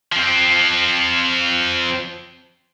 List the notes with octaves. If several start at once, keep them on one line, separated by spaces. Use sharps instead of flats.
F3 C4